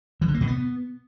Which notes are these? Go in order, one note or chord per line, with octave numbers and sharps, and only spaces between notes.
E3
D3
A#3
B2
B3